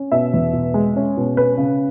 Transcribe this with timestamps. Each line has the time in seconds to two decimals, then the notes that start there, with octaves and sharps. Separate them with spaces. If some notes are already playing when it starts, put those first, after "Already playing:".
Already playing: C#4
0.12 B2 E5
0.34 E2
0.53 B2
0.74 G#3
0.96 C#4
1.17 B2
1.37 C#4 B4
1.58 C#3